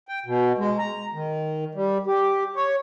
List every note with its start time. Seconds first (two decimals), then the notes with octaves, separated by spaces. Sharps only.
0.08 G5
0.26 B2
0.58 G#3
0.78 A#5
1.14 D#3
1.75 G3
2.07 G4
2.56 C#5